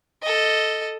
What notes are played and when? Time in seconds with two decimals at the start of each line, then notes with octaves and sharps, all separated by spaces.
0.22 A4 D#5